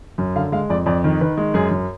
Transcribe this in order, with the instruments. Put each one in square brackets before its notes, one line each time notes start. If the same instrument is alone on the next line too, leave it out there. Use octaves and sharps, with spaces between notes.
[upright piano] F#2
D3 F5
G#3 F5
F2 D5
F2 D5
D#3
D#3 B4
G#3
F#2 G#4
F#2